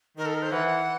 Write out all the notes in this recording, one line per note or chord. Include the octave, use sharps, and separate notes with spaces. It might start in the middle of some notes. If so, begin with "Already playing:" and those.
D#3 A#4
A4
A#4
C5
E3 F#5